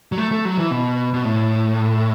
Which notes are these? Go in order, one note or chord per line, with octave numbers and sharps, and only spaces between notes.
F#3
A3
A3
F#3
E3
B2
B2
A2